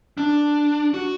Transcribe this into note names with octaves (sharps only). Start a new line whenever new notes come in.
D4
F#4